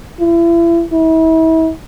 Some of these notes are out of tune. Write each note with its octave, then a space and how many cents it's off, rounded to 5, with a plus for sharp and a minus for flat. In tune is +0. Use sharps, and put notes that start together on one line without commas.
E4 +35
E4 -35